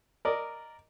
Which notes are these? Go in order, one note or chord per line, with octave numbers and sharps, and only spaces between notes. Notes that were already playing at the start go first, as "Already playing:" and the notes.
A#4 D5 D#5